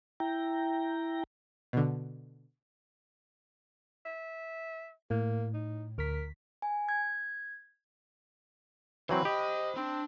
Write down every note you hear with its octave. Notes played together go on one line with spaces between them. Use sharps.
E4 G5 A#5
B2 D3
E5
A2 A#3
D#4
D2 A#4 B6
G#5
G#6
E3 F#3 C4 C5 B5
G4 D#5
C4 D4